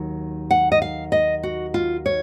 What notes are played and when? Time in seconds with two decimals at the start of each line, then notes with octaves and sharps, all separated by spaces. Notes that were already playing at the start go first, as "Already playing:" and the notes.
Already playing: D#2 D#3 F#3
0.51 F#5
0.72 D#5
0.82 F5
1.12 D#5
1.43 F#4
1.74 F4
2.06 C#5